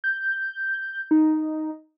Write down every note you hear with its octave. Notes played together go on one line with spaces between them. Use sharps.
G6
D#4